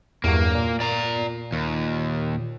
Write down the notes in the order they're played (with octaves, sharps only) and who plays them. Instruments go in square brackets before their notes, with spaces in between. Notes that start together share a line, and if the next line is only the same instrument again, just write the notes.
[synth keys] E2 G2 F#3 [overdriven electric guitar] A#3
[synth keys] A#2
[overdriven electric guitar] D5 A#5
D#2